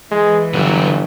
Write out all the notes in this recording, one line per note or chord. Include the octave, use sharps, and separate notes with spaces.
E3 G#3
G1 D3 F#3